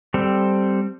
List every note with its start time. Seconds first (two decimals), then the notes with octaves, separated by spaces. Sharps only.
0.14 G3 C4 A4